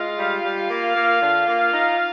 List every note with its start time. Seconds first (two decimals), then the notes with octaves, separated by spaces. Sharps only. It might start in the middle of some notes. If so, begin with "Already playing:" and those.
Already playing: G#3 F4 F5
0.19 G3
0.44 G3
0.70 A#3
0.96 A#3
1.22 D3
1.48 A#3
1.74 D#4